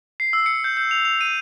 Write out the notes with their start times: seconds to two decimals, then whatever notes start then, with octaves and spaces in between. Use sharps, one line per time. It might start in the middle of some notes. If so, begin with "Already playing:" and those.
0.20 C7
0.33 E6
0.46 C#7
0.64 G6
0.77 G6
0.91 F7
1.05 F7
1.21 D#7